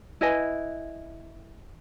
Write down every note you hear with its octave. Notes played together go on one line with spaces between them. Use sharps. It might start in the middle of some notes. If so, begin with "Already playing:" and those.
E4 B4 D#5 G#5